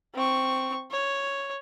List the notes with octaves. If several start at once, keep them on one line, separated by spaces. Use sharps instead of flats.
C4 C#6
C#5